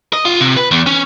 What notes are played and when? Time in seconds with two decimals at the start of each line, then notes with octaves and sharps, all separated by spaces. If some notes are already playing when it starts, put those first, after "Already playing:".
0.13 D#5
0.25 F4
0.41 C3
0.56 B4
0.71 E2
0.87 C#4